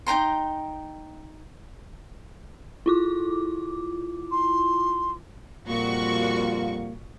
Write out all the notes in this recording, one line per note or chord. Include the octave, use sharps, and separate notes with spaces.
D#4 G5 A#5 C6
E4 F4 D6
C6
F2 A#2 G3 A#3 F4 F#4 C#6